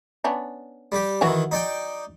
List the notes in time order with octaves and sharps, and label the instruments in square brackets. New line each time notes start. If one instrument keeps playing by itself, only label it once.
[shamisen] B3 C#4 D4
[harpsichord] G3 G4
[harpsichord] D#3 E3 [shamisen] F#3 E4 F#4
[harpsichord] D#4 D5 G5